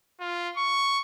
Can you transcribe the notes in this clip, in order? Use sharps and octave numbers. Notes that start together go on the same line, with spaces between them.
F4
C#6